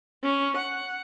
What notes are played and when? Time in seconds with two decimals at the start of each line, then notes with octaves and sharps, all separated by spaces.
0.23 C#4
0.57 F#5